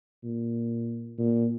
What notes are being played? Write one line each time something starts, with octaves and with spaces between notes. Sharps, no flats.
A#2
A#2